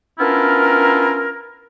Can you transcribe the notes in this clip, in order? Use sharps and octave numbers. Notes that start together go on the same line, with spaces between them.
B3 C#4 D4 E4 F4 A#4